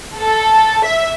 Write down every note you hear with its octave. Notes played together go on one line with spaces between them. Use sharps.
A4
E5